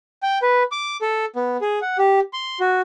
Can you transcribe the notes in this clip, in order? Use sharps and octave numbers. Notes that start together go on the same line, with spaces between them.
G5
B4
D6
A4
B3
G#4
F#5
G4
C6
F#4